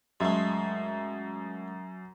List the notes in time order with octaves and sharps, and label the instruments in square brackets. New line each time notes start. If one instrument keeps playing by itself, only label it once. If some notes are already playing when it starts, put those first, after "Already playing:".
[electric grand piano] F#2 E5 C6 [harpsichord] G#3 A3